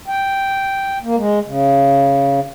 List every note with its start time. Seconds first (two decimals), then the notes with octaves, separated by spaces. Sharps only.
0.08 G5
1.03 A#3
1.17 G#3
1.47 C#3